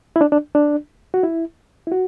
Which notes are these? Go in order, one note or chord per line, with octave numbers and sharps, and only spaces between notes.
E4
D4
D4
D4
F#4
E4
E4
F#4